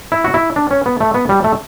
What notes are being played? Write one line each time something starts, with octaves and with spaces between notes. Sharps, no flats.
E4
F#4
E4
D4
C#4
B3
A3
B3
G3
A3